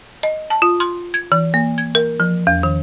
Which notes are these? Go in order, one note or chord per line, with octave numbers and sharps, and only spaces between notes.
D#5
A5
F4
C6
G#6
E3
A#3
G#6
A#4
F3
E2
D#3